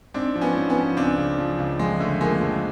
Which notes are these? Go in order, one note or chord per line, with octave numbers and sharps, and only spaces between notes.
G#2 C4 D4
F3
B3 C#4
G#2
B3 C#4
F3
C#2 C4 D4
C#3
F3
C#2
F2 G#3
D3 A3
F3 G#3 A#3
F2